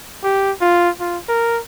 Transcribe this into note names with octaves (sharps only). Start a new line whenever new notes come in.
G4
F4
F4
A#4